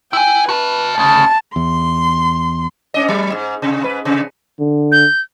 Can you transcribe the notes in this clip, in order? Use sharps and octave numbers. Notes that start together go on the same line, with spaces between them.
E4 G5 G#5
F#4 B4 A5
D2 C#3 A5
E2 C6
G#2 C#4 D#5
F#3
G#2
C3
G#2 B4
C3
D3
G6